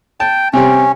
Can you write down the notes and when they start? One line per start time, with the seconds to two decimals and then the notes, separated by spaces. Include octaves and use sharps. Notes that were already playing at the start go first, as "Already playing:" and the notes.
0.20 G5 A5
0.54 C3 G3 C4 C#4